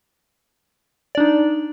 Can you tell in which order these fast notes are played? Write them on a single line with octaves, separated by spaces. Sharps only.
D5 D4 D#4